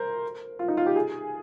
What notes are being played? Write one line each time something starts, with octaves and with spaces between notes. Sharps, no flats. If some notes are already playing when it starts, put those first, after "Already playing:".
Already playing: A#4 C5
F4
D#4
F4
G4
G#4